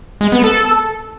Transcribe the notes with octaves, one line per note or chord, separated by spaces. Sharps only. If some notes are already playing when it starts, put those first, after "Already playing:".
G#3
B3
A4